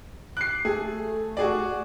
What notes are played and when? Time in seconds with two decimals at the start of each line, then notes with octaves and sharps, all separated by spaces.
0.37 D6 F#6 C7
0.65 A3 G#4
1.37 F#4 G#4 D5